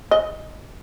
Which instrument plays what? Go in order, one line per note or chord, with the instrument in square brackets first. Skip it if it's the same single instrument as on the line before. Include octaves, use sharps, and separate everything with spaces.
[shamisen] D#5